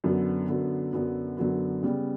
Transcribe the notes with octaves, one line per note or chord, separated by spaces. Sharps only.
F#2 D3 F#3 B3
F#2 D3 F#3 B3
F#2 D3 F#3 B3
F#2 D3 F#3 B3
C#3 G3 B3